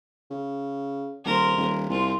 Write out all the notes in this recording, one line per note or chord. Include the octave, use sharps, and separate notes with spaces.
C#3
D#1 A#4 C5
D#1
C2 C4 F4